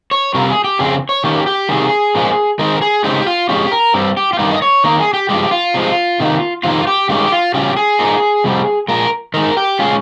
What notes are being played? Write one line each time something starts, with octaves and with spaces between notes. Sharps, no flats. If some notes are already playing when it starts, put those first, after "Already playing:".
C#5
C3 G3 C4 F4 A#4
G#4
G4
F2 C#3 C4 G#4
C#5
D#3 A#3 C#4 G4
G4
C3 D#3 G3 G#4
A#2 F3 G#3
D#3 G#3 C4 D#4 A#4
G#4
C#3 G#3 C4 D#4 G4
F4
F2 D#3 G#3 C#4 G4
A#4
G2 G3 C4
G4
F4
G2 D#3 G3 A#3 D#4 G4
D#5
C#5
D#3 A#3 D#4 A#4
G#4
G4
G2 F3 G#3 G4
F4
C3 F3 G#3
C3 D#3 A#3 D#4
F2 C3 D#3 A#3 F4
G4
G2 D#3 G#3 C#4 G4
F4
C#3 G3 C#4 F4 G4
G#4
A#2 G#3 D#4
F2 C3 G3
A#2 F3 G#3 A#4
D#3 G#3 D#4 A#4
G4
A#2 G#3 C#4 F4 G#4